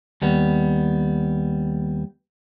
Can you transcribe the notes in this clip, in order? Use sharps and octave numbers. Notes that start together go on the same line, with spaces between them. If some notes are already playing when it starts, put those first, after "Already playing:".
D#2 G3 B3